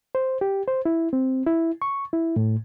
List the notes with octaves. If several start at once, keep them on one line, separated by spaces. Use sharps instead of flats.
C5
G4
C5
E4
C4
E4
C#6
E4
A2